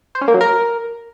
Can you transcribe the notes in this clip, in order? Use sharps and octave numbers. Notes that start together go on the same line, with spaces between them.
C5
C#4
A#3
F#3
A#4